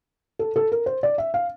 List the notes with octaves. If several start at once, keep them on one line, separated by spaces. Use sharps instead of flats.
A4
A4
A#4
C5
D5
E5
F5